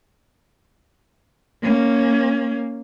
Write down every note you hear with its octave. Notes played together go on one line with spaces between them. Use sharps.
A#3 C#4